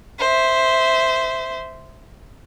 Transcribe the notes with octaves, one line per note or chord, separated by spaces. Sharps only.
C5 E5